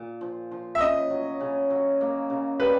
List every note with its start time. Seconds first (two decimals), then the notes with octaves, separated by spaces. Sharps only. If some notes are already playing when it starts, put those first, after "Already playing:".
Already playing: A#2
0.21 F3
0.51 F3
0.75 E5
0.80 C#3 D#5
1.10 F#3
1.41 C#3
1.70 F#3
2.01 A#3
2.30 C#3
2.60 G3 B4